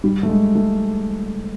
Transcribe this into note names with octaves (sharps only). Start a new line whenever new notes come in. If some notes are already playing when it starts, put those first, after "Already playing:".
G3
A3
G#3
A3